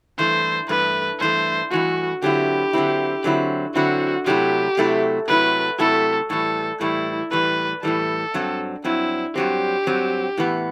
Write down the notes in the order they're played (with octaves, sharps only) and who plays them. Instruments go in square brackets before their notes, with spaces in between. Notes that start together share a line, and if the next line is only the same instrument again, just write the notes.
[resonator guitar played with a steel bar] G2 E3 A3 [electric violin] C5
[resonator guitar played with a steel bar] G2 E3 A3 [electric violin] B4
[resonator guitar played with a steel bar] G2 E3 A3 [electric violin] C5
[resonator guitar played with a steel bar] G2 E3 A3 [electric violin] F#4
[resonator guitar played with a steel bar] D3 F#3 C4 E4 [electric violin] G4
[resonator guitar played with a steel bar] D3 F#3 C4 E4
D3 F#3 C4 E4
[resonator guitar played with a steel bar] D3 F#3 C4 E4 [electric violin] F#4
[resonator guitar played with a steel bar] C3 F#3 A3 E4 [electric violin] G4
[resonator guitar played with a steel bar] C3 F#3 A3 E4
[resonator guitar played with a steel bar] C3 F#3 A3 E4 [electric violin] B4
[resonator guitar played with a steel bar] C3 F#3 A3 E4 [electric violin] A4
[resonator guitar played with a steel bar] A2 E3 G3 [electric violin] A4
[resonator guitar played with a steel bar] A2 E3 G3 [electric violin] E4
[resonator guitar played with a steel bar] A2 E3 G3 [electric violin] B4
[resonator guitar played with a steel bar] A2 E3 G3 [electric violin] A4
[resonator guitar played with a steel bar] G2 F#3 C4
[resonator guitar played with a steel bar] G2 F#3 C4 [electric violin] E4
[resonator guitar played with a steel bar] G2 F#3 C4 [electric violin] G4
[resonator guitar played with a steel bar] G2 F#3 C4
A2 E3 B3